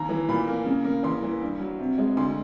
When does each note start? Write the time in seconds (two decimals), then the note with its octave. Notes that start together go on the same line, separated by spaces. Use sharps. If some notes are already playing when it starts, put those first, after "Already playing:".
Already playing: D#2 A#5
0.09 E3
0.29 A#2 B5
0.47 A#3
0.65 C#3
0.85 A#3
1.03 E2 C6
1.23 E3
1.41 G2
1.59 F#3
1.79 C3
1.98 G#3
2.17 D2 C6